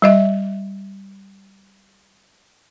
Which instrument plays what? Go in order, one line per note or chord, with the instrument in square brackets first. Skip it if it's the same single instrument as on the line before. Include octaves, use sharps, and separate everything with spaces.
[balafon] G3 D#5 E5